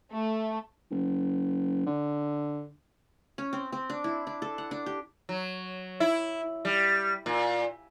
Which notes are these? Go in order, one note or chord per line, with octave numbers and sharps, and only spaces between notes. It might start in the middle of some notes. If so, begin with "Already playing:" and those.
A3
F#1
D3
C#4
C4
C4
D4
E4
D4
A4
F#5
D4
G4
F#3
E4
G3
A#2